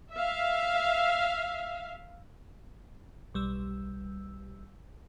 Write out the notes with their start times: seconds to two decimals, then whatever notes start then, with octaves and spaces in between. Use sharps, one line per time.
0.12 E5 F5
3.34 B1 G3 E6